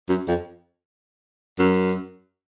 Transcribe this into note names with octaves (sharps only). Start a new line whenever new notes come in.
F#2
F2
F#2